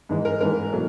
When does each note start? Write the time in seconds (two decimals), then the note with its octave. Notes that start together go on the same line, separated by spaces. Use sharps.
0.09 G#2 E3 G#3
0.25 A#4
0.41 G#2 E3 G#3 A#4
0.72 B2 F#3 A3